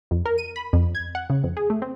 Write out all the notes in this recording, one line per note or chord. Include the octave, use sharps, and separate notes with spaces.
F2
A#4
D#7
B5
F2
G#6
F#5
C#3
F2
G#4
A3
C4